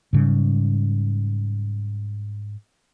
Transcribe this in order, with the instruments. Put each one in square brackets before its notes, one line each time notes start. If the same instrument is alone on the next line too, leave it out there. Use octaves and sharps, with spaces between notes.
[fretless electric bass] G#2 C#3 G3